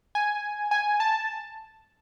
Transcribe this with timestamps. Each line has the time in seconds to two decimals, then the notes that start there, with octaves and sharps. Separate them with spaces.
0.15 G#5
0.71 G#5
1.00 A5